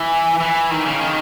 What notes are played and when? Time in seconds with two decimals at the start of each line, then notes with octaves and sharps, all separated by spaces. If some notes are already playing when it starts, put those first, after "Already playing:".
Already playing: E3
0.40 E3
0.71 D#3
0.86 C#3
1.01 D#3